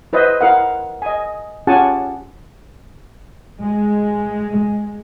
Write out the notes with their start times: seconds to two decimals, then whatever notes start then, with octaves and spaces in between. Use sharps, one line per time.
0.13 E4 B4 C5 D#5 E5
0.41 E4 A#4 F5 F#5
1.02 D#5 G#5
1.67 C#4 F4 G4 F#5 G#5 A5
3.61 G#3